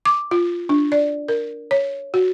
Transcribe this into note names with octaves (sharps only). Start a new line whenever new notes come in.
D6
F4
D4
D5
A#4
C#5
F#4